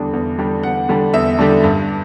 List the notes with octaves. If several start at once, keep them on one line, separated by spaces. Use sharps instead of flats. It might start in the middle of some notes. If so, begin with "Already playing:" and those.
Already playing: E2 D3 G3 D4
E2
D3 G3 D4
E2 F#5
D3 G3 D4
E2 E5
D3 G3 D4
G2